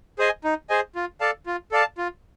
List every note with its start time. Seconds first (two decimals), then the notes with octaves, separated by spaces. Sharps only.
0.19 G#4 C5 D#5 G#5
0.44 D#4
0.70 G#4 C5 D#5 G#5
0.95 F4
1.21 A4 D5 F5 A5
1.46 F4
1.72 A4 D5 F5 A5
1.98 F4